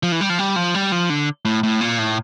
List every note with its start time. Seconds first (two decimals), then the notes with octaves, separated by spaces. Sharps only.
0.03 F3
0.12 E3
0.21 G3
0.30 F3
0.39 G3
0.56 F3
0.75 G3
0.92 F3
1.10 D3
1.45 A2
1.63 A2
1.81 A#2
1.98 A2